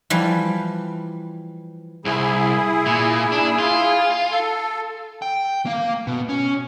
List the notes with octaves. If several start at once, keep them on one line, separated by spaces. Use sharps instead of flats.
E3 F3 G3
C2 E4 G#4
A#2
D4
F4
A4
G5
A#3 F5
B2
C#4